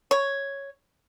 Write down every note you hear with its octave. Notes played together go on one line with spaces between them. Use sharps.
C#5